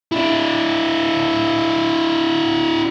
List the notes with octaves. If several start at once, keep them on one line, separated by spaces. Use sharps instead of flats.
D4 E4